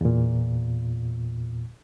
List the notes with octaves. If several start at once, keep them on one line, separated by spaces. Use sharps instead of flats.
E2 A#2